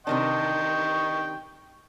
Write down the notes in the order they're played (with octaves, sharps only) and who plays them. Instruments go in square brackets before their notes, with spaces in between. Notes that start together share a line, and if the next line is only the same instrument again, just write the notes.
[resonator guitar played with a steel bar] C3 D#3 D4 [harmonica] D#5 G5 C#6